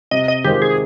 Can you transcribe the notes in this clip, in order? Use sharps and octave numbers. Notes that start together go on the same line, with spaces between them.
C3 D#5
D#5
D#3 G#3 C4 F4 G4
G#4